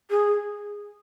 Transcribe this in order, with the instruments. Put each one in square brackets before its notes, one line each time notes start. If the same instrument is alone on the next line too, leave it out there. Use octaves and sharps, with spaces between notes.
[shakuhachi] G#4